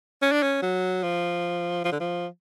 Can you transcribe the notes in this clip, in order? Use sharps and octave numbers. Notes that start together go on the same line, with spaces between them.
C#4
D4
C#4
F#3
F3
F3
D3
F3